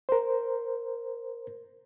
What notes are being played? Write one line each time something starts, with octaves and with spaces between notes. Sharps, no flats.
A#4 C5